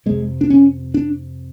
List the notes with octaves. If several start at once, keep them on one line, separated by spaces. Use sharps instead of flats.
F2 C3 G#3
D4
C#4
D4